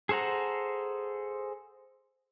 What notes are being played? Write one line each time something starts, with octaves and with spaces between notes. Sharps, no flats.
G#4 A4 C5 F#5 A#5